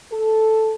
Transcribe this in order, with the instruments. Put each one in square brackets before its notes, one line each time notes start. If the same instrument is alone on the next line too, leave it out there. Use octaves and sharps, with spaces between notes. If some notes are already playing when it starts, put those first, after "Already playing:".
[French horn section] A4